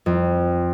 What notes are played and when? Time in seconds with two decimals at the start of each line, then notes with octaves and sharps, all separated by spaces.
0.06 F2